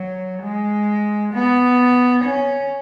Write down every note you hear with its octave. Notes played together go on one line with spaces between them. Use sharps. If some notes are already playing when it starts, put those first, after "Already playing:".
Already playing: F#3
G#3
B3
C#4